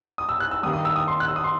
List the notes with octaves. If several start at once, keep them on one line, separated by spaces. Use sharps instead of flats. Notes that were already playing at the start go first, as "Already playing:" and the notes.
D#6
E6
F#6
E6
G2 D#3 G3 D#6
D#6
E6
D#6
C6
F#6
E6
D#6
C6